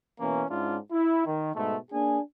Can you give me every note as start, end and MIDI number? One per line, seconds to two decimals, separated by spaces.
0.20 0.44 47
0.20 0.44 52
0.20 0.44 58
0.20 0.44 61
0.50 0.77 44
0.50 0.77 61
0.50 0.77 62
0.50 0.77 64
0.50 0.77 65
0.91 1.24 64
1.26 1.50 51
1.55 1.77 44
1.55 1.77 47
1.55 1.77 56
1.55 1.77 57
1.91 2.19 58
1.91 2.19 62
1.91 2.19 68
1.91 2.19 80